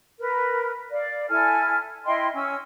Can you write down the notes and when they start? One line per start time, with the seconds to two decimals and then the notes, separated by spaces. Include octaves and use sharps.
0.19 A#4 B4
0.91 D5 F5
1.28 E4 A4 G#5 F6
2.05 E4 D#5 G5 C6
2.34 C#4 E6